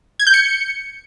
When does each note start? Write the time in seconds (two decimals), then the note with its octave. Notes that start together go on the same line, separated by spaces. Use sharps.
0.19 G#6
0.27 G6
0.34 C#7